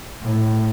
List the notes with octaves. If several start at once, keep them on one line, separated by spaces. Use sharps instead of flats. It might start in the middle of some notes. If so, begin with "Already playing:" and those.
A2